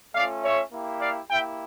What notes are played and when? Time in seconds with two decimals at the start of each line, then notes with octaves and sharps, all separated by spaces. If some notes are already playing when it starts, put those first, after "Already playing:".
0.14 A3 C#4 F4 D5 F5
0.43 C#5 E5
0.73 A#3 E4 G4
1.01 D5 F5
1.31 A#3 E4 G4 E5 G5